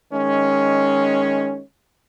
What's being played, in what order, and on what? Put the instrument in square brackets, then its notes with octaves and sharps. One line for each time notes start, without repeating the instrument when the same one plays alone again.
[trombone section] D#3 G#3 C#4